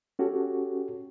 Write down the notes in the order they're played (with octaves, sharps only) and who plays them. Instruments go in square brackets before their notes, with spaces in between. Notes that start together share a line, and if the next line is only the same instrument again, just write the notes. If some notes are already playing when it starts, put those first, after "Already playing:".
[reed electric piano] C#4 F#4 G4 A4